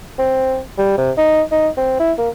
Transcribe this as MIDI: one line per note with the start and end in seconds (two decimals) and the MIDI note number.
0.19 0.60 60
0.78 0.93 55
0.98 1.11 48
1.17 1.42 63
1.51 1.68 63
1.77 1.99 60
2.00 2.12 64
2.18 2.29 58